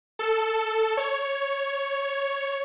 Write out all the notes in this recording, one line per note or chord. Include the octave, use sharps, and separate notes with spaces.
A4
C#5